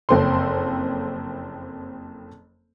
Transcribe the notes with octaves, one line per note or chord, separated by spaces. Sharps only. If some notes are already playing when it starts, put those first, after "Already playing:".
F#1 F2 C4 A4 C6